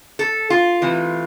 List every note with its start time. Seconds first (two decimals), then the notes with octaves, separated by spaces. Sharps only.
0.19 A4
0.50 F4
0.82 C3 E3 A3